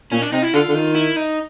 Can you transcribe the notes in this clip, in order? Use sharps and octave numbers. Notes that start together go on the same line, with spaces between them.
A#2 C#4
D4
C3 D#4
E4
D3 F4
D3
D#3
E4
D#4